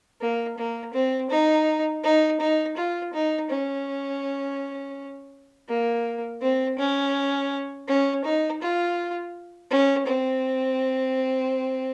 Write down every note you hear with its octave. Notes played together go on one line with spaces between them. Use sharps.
A#3
A#3
C4
D#4
D#4
D#4
F4
D#4
C#4
A#3
C4
C#4
C#4
D#4
F4
C#4
C4